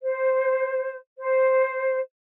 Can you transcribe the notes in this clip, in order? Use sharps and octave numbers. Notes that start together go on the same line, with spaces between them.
C5
C5